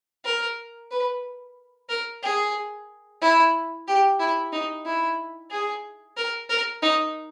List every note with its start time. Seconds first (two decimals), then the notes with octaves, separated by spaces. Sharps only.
0.25 A#4
0.92 B4
1.89 A#4
2.23 G#4
3.22 E4
3.88 G4
4.20 E4
4.53 D#4
4.85 E4
5.51 G#4
6.17 A#4
6.49 A#4
6.82 D#4